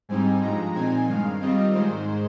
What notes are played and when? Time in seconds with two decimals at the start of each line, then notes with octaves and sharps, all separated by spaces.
0.09 G#2 G3 C4 D#4 G#5
0.42 G2 F3 G#3 A#5
0.75 A#2 F3 C4 D#4 G#5
1.08 G2 D#3 G#3 F5
1.41 D#3 G3 C4 F4 D#5
1.75 G#2 D#3 G#3 C5